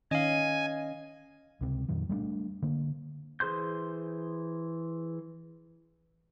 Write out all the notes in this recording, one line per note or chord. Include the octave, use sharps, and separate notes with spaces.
D#3 C#4 D#5 F5 G#5
C#2 C3
F2 A#2 D#3 F#3
G3 A3 C4 D4
D3 A#3
E3 G#4 C5 C6 G6